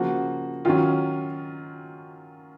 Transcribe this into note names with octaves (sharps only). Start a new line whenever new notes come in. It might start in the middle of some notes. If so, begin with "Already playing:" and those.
Already playing: C#3 F3 A#3 F#4
D#3 F#3 C#4 F4